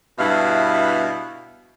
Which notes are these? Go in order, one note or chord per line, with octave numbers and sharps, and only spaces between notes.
G2 B2 E4 E5 F5